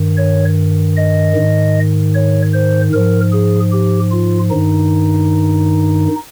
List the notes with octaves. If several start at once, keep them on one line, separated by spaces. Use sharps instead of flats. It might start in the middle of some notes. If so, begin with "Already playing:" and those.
Already playing: G2 D#3
C#5
D#5
G#2 D#3
C#5
C5
G#2 F3 A#4
G#4
G4
F4
G2 D#3 D#4